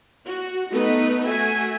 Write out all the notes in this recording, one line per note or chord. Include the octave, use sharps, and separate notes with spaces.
F#4
A3 B3 D#4 B4
A3 F#4 E5 G#5